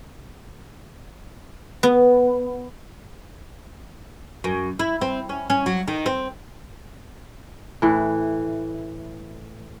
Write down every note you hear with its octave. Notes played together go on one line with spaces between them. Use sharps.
B3
F#2
E4
C4
C#4
C#4
F#3
D#3
C4
A2 E3